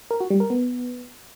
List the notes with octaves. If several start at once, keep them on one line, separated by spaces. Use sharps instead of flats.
A#4
F#4
G3
A#4
B3